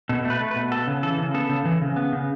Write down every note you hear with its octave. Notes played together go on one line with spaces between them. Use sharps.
B2 A4
A3
B4
A3
B4
B2
B3 A4
C#3
E3 A4
C#3
B3 A4
C#3
E3
C#3
B3
C#3